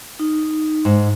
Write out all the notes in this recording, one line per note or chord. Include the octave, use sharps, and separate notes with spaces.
D#4
G#2